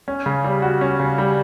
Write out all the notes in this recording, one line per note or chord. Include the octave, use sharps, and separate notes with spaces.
C#4
C#3
G3
F#4
C#4
C#3
G3